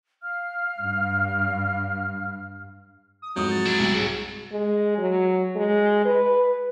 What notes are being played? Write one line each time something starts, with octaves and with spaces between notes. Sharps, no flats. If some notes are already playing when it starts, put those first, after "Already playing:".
F5 F6
G2
D#6
F2 G#2 F#3 D#6 G6
A6
G#3 D4 E4
C2
G#2 G#4
G#3
F#3
G#3
B4